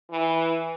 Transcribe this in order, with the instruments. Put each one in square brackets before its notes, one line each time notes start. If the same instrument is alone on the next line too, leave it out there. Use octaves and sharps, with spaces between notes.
[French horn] E3